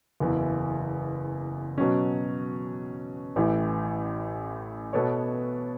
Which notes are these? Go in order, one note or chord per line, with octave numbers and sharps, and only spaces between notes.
F#1 E2 E3
B2 F#3 C#4
A1 A2 E3
B2 B3 A4 C#5